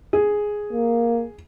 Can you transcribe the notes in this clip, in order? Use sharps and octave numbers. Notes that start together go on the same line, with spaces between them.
G#4
A#3